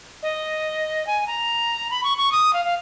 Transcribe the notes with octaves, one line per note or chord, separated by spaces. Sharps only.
D#5
G#5
A#5
B5
C#6
C#6
D#6
F5
F5